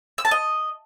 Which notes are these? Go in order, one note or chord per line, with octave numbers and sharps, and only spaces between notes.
E6
A5
D#5